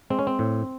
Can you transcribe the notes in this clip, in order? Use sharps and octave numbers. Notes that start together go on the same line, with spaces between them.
G#3 C4
C#4
C4
A2